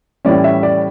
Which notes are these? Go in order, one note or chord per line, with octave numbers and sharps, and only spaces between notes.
A2 E3 G3 C#4 D5
E5
D5